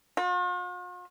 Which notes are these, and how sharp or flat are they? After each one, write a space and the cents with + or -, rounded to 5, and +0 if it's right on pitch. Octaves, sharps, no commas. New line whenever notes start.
F4 +45